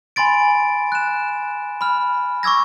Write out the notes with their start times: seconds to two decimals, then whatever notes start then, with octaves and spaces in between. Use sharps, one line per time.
0.16 G#5 B5 C6 A6 D7
0.92 F#6 E7
1.81 B5 F6
2.43 C#6 D6 E6 G#6 A#6